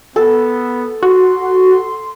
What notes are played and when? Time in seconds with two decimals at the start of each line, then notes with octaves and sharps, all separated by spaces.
0.16 B3 A4
1.03 F#4 C6